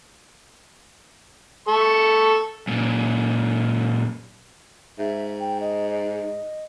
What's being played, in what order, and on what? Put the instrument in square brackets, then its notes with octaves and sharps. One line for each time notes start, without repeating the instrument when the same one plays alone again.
[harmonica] A4 C#6
[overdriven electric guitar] F#2 A#2
[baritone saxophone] G#2 [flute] E5
[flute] G5
D#5
D#5